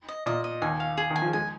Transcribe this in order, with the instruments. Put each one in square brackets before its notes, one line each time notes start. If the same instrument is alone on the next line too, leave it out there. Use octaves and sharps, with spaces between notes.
[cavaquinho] D#5
[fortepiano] A#2 [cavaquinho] D#5
[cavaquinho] D#5
[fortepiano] D#2 D#3 [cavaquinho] G#5
[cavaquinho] F5
G#4
[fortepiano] D#3
[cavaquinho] G#5
[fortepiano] F3
[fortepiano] G#3 [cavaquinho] G#5